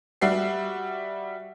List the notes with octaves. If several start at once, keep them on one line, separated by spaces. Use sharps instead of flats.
G3 F#4 E5 C7